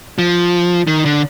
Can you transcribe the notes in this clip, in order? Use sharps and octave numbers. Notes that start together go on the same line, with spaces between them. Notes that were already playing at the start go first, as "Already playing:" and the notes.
F3
D#3
D3